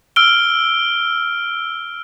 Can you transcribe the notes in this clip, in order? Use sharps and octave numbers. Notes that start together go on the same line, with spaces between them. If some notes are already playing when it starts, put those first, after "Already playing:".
E6 F6 D7 G7